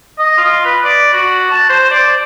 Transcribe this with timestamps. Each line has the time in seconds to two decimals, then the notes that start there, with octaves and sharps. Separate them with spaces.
0.18 D#5
0.38 F4
0.65 B4
0.84 D5
1.13 F#4
1.51 A5
1.70 C5
1.91 D5